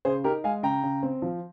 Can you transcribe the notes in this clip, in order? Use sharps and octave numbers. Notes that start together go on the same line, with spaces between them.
C#3 G#4 C5
D#4 G4 A#4
G#3 F5 G#5
C#3 G5 A#5
C#3
C4
F3